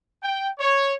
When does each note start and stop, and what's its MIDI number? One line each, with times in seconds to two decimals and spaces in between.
0.22 0.48 79
0.59 0.94 73